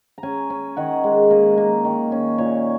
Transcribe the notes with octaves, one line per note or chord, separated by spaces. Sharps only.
A#5
C#4 G#5
C#4
D#3 F#5
G#3
A#3 D#5
A#3
D#3
C#4
A#2 C#5